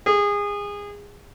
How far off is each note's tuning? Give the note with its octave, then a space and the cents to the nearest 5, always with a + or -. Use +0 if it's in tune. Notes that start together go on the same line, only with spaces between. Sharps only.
G#4 -25